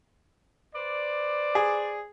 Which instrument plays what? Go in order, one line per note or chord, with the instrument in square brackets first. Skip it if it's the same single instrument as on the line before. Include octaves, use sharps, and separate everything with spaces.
[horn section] B4 C5 D5
[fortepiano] G#4